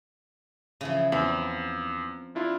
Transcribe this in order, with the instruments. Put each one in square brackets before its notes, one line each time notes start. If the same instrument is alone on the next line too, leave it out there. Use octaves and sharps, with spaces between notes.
[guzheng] C#3 E3 F3
[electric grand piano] E2 [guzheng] F3 C4 B5
[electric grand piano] D4 E4 F4